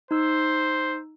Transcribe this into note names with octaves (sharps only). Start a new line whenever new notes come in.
D#4 C5 E6